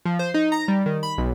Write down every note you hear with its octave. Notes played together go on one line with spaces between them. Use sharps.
F3
C5
D#4
A#5
G3
D#3
B5
B1